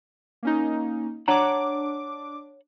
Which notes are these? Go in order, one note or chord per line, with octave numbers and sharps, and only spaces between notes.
A#3 C#4 D#4
D4 C#5 F#5 A#5 D6